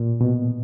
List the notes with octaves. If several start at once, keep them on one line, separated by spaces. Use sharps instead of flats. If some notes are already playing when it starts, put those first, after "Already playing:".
Already playing: A#2
B2